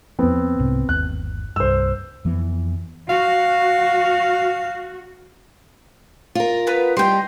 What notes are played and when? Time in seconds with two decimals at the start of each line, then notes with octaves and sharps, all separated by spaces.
0.19 E2 F3 B3 C4
0.59 C2 G#2 C3
0.89 G1 D#2 F#6
1.56 C2 G2 C5 E6
2.25 F2 E3 B3
3.09 F#4 F5
6.35 F4 A#4
6.67 B3 B4
6.97 G3 D#4 G5 C6